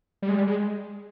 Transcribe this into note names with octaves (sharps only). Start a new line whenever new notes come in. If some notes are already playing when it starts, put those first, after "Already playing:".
G3
G#3
G3
G#3